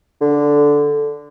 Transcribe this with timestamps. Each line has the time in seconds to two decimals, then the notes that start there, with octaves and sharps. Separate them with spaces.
0.21 D3